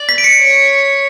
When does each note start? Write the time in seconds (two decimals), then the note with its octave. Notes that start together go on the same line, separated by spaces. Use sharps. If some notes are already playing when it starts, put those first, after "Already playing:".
Already playing: D5
0.09 B6
0.18 D7
0.24 C#7
0.40 C#5